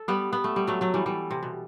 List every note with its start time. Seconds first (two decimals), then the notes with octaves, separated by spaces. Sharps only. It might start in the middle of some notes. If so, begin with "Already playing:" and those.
Already playing: A4
0.08 G3 B3
0.33 B3
0.44 A3
0.56 G3
0.67 F#3 A3
0.81 F#3 A3
0.94 E3 G3
1.06 E3 G3
1.31 C3
1.43 B2